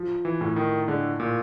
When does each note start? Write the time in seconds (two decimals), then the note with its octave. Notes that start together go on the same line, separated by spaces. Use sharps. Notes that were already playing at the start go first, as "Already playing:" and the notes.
Already playing: F3
0.25 E3
0.41 A2
0.56 D#3
0.88 D3 G#3
1.20 A#2